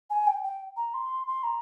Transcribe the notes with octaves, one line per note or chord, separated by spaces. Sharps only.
G#5
G5
G5
A#5
C6
C6
A#5